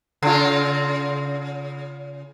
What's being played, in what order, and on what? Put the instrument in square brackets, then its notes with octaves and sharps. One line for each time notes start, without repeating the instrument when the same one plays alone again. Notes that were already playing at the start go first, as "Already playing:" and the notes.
[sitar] C#3 F4